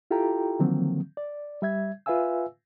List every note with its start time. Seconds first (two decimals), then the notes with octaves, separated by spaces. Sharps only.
0.11 E4 F4 G4 A4 G5 A#5
0.59 D3 D#3 F3 F#3 A#3 C4
1.17 D5
1.62 G3 E5 G#6
2.06 F4 B4 E5 F5 G#5 E6